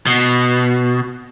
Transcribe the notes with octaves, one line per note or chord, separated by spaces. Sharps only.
B2